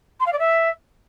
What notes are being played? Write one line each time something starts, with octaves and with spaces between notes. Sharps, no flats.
C6
F5
D5
E5